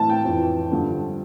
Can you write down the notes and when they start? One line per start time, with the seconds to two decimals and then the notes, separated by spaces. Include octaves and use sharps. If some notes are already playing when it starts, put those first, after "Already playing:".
Already playing: A2 E3 A5
0.09 G5
0.25 F2
0.30 E3
0.71 G2 D3 F3